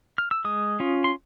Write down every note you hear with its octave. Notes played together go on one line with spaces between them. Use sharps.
F6
E6
G#3 D#6
C#4 F4
C6